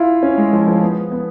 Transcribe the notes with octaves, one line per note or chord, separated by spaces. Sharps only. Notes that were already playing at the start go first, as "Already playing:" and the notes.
Already playing: E4 F4
C#4
G#3
F3
F3
B3
B3